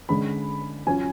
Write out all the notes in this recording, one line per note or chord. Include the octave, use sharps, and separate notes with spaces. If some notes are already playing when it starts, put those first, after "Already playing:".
D3 G#3 C#4 B5
F#3 C#4 F4 G#5